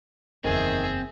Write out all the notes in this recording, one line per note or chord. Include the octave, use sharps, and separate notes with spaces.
F#1 E2 D#3 C4 G#4 E5